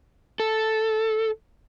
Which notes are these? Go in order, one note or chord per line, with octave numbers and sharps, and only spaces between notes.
A4